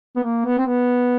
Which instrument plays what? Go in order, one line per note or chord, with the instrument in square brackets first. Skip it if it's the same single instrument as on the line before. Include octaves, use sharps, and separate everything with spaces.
[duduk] B3
A#3
B3
C4
B3